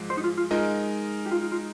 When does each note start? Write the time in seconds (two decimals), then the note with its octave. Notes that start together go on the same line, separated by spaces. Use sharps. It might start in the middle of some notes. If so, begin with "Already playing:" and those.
Already playing: G#2 F3 G#3
0.10 C5
0.17 D#4
0.24 F4
0.37 F4
0.51 G#3 D#4 F4 A#4 D#5
1.26 G4
1.31 F4
1.42 F4
1.52 F4